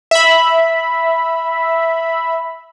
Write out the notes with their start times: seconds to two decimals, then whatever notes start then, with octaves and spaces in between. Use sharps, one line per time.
0.11 E5 B5